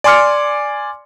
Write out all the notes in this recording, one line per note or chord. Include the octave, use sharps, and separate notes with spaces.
D5 G#5 C6 D6 F6 C#7